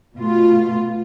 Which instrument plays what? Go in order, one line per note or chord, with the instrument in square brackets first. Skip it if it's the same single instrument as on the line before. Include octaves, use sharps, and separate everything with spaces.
[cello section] B2 A3 F4